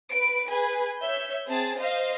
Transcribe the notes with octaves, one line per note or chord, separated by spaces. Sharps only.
B4 D7
G#4 B4 G#5
C#5 E5 G6
C4 G#4 A5
C5 D#5 F5